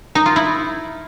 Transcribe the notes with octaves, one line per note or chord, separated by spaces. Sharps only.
D#4
F4
E4